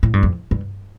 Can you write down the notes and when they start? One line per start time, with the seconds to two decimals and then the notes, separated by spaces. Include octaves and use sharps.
0.03 A2
0.13 G2
0.23 F2
0.51 G2